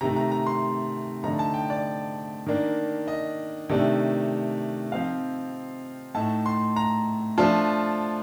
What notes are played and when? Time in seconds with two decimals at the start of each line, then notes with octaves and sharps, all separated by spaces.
0.01 C3 D#3 A3 A#5
0.16 A#5
0.32 A#5
0.47 C6
1.23 D3 F3 A3 D#4 A#5
1.39 A5
1.54 G5
1.70 D5
2.47 D#3 A#3 D4
3.08 D#5
3.69 C3 D#3 A3 D4
4.92 F3 C4 D#4 F5
6.14 A2 A3 D#4 A5
6.46 C6
6.76 A#5
7.38 F3 A3 D4 F4 A5